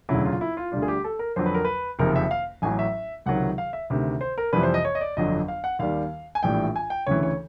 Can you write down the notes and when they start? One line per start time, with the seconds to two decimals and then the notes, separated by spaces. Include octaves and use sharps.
0.09 E1 D2 C#3 F#3 E4
0.25 F4
0.41 E4
0.57 F4
0.72 D2 D3 G3 F4
0.82 G#4
0.88 G4
1.04 A4
1.19 A#4
1.36 F2 D3 F#3 C5
1.46 B4
1.54 A#4
1.65 B4
1.99 F#1 F2 C3 D#3 A#4
2.16 E5
2.31 F5
2.62 A1 A2 F#3 G#5
2.79 E5
3.26 C#2 C3 D#3 F#3 F#5
3.58 F5
3.73 E5
3.90 D2 C3 D#3
4.21 C5
4.38 A#4
4.53 F2 C3 E3 G3 B4
4.63 C5
4.74 D#5
4.85 C#5
4.95 D#5
5.01 D5
5.17 G1 F2 D3 F#3 D#5
5.48 F5
5.64 F#5
5.79 D#2 D#3 G3 F5
6.35 G#5
6.43 A#1 A2 E3 G3 G5
6.76 G#5
6.90 G5
7.07 D2 C#3 E3 C#5
7.23 C#5